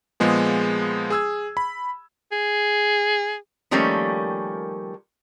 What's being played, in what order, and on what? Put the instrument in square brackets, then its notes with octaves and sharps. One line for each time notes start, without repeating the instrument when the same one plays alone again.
[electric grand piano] A#2 F3 G#3 B3 G#4
G#4 E6 G#6
B5
[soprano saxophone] G#4
[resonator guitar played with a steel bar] D#3 F3 G3 A3 A#3 C#4